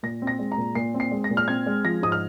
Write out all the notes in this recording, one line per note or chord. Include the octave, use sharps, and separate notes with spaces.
A#2 A#6
C4
A#6
G#3
A#5
A#2
A#2 C7
C4
C7
G#3
A#6
A#2
F6
C4 G#6
G#3
F3 A#6
G#2 D#6
F6